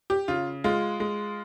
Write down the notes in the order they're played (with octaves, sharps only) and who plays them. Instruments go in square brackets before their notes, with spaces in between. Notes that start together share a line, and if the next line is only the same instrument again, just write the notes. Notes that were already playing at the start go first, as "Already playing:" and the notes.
[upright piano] G4
C#3 F4
G#3 F4
G#3